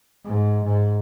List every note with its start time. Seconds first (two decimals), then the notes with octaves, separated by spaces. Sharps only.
0.25 G#2
0.64 G#2